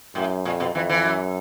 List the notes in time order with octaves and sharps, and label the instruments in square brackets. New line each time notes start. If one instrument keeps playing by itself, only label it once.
[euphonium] F#2 [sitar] A2
[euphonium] F2 [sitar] A#2
[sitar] B2
[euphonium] F2 [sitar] E3
[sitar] E3
[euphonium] F#2